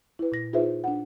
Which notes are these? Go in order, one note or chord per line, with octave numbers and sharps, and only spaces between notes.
E4 B4
A#2 A#6
D#4 F4 G#4 B4 C5 E5
D4 F#5